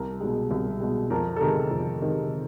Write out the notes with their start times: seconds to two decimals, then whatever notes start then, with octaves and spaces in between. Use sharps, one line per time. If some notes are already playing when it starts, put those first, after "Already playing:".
Already playing: C2 A#4
0.20 B2 G#3
0.51 C2
0.80 B2 G#3
1.10 F2 A#4
1.36 A4
1.41 C3 D#3 G#3 A#4
1.71 F2
2.01 C3 D#3 G#3